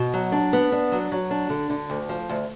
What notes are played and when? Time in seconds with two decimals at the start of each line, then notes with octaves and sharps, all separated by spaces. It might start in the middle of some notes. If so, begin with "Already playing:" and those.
Already playing: B2
0.14 F#3
0.32 D4
0.53 B3
0.72 D4
0.92 F#3
1.12 F#3
1.31 D4
1.50 D3
1.70 D3
1.90 D2
2.09 F3
2.29 D2